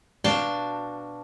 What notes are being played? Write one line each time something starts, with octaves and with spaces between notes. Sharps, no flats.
B2 D4 F#4 F5 G5 A5